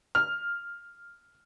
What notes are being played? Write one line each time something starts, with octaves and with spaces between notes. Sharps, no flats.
F6